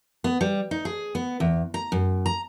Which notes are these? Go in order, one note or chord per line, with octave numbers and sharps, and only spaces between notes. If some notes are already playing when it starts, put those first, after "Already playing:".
B3
G3
D#4
G#4
B3
E2
A#5
F#2
A#5